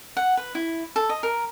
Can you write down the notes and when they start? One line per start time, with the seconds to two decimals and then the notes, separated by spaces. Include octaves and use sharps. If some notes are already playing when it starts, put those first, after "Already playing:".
0.17 F#5
0.37 B4
0.55 E4
0.96 A4
1.09 D#5
1.23 A#4